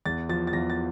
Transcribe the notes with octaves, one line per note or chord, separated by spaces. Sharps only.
E2 A6
F3 A6
A6
E2 A#6
A6